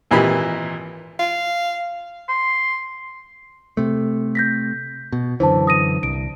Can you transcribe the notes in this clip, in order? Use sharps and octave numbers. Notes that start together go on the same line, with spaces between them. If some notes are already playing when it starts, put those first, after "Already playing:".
G#1 A#2 E3 G4 B5
F5
C6
C3 A3
G6 A#6 B6
B2
F#2 D3 E3 C5 A5
D#6 A#6 D#7
C2 D7